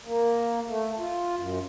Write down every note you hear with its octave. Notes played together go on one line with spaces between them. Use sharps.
A#3
A3
F4
F#2